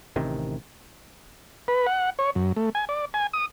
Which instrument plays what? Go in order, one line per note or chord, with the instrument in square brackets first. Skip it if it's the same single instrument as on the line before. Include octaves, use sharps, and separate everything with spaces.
[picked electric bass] A1 C3 D#3
[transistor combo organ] B4
F#5
C#5
F#2
A3
G#5
D5
G#5
D#6